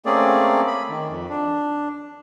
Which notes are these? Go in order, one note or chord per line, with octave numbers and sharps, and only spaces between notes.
A3 A#3 C4 C#4 G#4 D5
B5
D#3
F2
D4